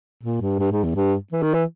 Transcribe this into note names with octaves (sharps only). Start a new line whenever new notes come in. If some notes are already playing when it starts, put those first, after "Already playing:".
A#2
G2
G2
G#2
E2
G2
E3
D#3
E3